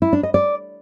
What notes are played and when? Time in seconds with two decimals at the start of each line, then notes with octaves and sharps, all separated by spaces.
0.02 E4
0.13 D4
0.23 D#5
0.34 D5